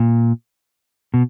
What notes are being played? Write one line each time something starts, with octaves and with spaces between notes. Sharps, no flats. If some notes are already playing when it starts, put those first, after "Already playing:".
Already playing: A#2
B2